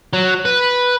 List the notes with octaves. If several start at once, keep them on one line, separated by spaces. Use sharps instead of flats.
F#3
B4